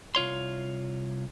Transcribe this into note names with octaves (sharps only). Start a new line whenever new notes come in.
C2 F4 C#5 C6